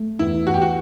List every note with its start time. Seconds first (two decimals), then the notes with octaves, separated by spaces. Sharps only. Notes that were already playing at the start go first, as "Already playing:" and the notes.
Already playing: A3
0.19 E2 E4
0.47 E2 F#4
0.54 G4
0.62 F#4